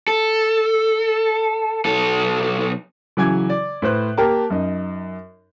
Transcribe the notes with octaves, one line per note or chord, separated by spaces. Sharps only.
A4
B1 A4
C#3 E3 F#3 G#5 D6 G#6
D5
A2 B4 C5 F#6
A#3 G4 A#4 A5
F#2 D#4